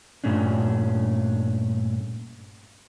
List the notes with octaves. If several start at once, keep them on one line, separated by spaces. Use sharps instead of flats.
G2 A#2 A3 C#4 D4